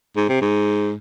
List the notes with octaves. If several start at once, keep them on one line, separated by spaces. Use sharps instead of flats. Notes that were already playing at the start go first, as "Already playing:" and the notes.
G#2
C3
G#2